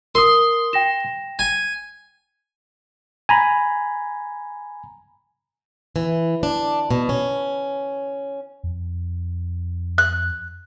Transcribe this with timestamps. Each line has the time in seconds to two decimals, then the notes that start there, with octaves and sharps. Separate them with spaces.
0.15 A#4 C6 D#6
0.73 G5 A#6 E7
1.39 G#5
3.29 G#5 A#5 B5
5.96 E3
6.43 D4
6.91 B2
7.09 C#4
8.63 F2
9.98 F#6